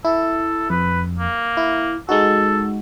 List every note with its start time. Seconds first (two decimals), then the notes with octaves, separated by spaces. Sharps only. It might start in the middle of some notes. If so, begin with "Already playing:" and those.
0.05 E4 A4
0.70 F2 B4
1.19 A#3
1.57 E4
2.09 G#3 D#4 F#4 A4